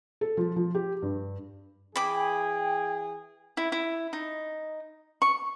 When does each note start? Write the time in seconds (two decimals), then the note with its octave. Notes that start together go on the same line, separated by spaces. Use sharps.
0.21 A4
0.37 F3
0.56 F3
0.75 G4
1.02 G2
1.96 E3 G#4 G5 B5 D6
3.57 E4
3.72 E4
4.13 D#4
5.22 C#6